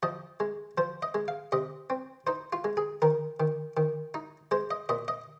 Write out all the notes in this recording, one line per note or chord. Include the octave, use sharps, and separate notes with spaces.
F3 D#5
G#3
F3 C5
D#5
G#3
F5
C3 D#5
C4
D#4 C5
F4
G#3
G#4
D#3 A#4
D#3
D#3
D#4
G#3 C5
D#5
A#2 D#5
D#5